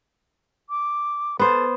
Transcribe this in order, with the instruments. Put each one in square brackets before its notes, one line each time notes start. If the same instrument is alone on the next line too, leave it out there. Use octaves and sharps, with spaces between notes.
[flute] D6
[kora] B3 C5 [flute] A4